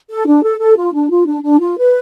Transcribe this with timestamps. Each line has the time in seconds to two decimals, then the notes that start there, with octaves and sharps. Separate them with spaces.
0.10 A4
0.26 D4
0.42 A4
0.59 A4
0.77 F4
0.93 D4
1.09 F4
1.26 D4
1.43 D4
1.60 F4
1.77 B4